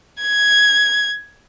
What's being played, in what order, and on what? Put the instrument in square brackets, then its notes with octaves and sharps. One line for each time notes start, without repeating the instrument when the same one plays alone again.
[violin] G#6